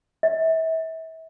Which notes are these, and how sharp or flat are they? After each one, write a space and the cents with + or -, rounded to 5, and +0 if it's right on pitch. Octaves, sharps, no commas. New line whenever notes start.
E5 -30